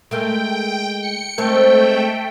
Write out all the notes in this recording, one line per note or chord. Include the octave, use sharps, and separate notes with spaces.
G#3 A3 A#4 G5
C#7
G#3 A3 C4 A#4 G5